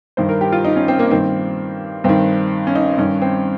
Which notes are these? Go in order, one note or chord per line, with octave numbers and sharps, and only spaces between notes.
G2 D#3 C5
A#4
G4
F4
D#4
C#4
C4
A#3
G2 D#3 C4
G2 D#3 C4
C#4
D#4
G2 D#3 C#4
C4